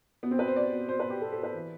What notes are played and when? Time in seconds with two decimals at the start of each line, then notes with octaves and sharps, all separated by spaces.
0.23 B2 B3
0.31 C4
0.39 B2 B4
0.48 C5
0.56 B2 D5
0.72 B2
0.88 B2 C5
0.99 B4
1.05 B2 G4
1.21 B2 A4
1.32 A4
1.38 B2
1.43 B4
1.54 E3